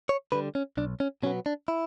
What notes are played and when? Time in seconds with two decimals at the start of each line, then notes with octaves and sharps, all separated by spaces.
0.09 C#5
0.32 D3 G3 B4
0.55 C#4
0.77 B1 D4
1.00 C#4
1.23 B2 F#3 B3 C#4
1.46 D4
1.68 E4